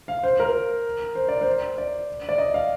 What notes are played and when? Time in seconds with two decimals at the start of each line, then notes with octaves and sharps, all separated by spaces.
0.08 F5
0.23 C5
0.40 A#4
1.15 C5
1.28 D5
1.41 C5
1.78 D5
2.29 D5
2.38 D#5
2.54 F5